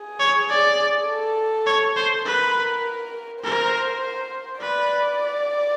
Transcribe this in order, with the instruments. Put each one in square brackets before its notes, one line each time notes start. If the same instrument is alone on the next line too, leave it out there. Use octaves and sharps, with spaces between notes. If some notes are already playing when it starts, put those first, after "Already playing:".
Already playing: [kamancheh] G#4
[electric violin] C#5
D5
[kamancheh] A4
[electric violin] C#5
C5
[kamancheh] A#4 [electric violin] B4
[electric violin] A#4 [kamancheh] C5
[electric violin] B4 [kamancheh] D5